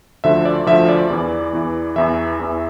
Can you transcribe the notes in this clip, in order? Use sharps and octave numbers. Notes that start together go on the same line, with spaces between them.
D2 D3 F3 E5
D5
D2 D3 F3 E5
D5
E2 E3
E2 E3
E2 E3 E5
E2 E3